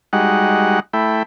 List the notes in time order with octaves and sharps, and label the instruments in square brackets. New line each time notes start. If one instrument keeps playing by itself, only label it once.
[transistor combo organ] G3 G#3 D#4 F#4 F#5
A3 E4 G5 B5